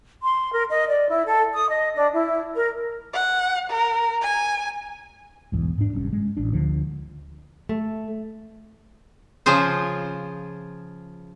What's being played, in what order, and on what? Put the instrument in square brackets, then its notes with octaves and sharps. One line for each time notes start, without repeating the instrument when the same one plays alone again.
[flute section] C6
A#4
D#5
D5
E4
A4
D#6
D#5
D4
E4
A#4
[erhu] F#5
A#4
G#5
[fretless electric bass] B1 E2 G#2
G#2 D4
F1 G2 C#4
G#3
A1 D4
D2 D3 F3
[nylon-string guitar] A3
[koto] C#3 F3 F4 G#4 C5